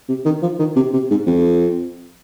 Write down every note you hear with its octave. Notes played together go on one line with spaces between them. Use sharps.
C3
D#3
F3
D#3
C3
C3
G#2
F2